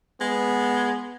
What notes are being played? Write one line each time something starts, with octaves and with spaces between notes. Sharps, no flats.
G#3 B3